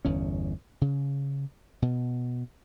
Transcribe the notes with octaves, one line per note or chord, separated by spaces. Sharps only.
G1 E2 C#4
C#3
B2